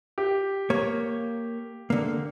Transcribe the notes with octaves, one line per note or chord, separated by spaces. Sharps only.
G4
A#3 C#5
D3 A#3